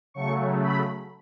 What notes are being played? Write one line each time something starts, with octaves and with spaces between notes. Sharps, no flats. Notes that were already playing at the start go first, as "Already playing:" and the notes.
C#3 F#3 A3 C#6
B5